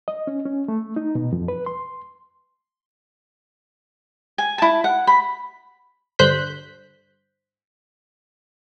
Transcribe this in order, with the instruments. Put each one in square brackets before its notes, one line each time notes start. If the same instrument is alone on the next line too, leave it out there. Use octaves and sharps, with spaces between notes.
[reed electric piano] D#5
C#4
C#4
A3
D#4
B2
F2
B4
C6
[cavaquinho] G#5
E4 A5
F#5
B5
[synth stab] G2 D3 C5 F#6 G6 B6